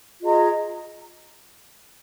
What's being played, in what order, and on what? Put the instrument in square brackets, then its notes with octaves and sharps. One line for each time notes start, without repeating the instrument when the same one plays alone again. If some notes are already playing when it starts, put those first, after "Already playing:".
[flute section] F4 G#4 D#5 A#5